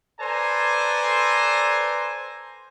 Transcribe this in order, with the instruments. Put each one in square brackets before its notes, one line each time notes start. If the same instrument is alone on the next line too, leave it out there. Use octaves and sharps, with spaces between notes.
[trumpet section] A4 B4 C5 D5 G#5 A#5